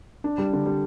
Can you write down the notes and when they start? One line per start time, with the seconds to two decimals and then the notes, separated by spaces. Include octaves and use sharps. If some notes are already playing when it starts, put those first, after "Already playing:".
0.24 D4
0.38 G3
0.53 D3
0.66 G3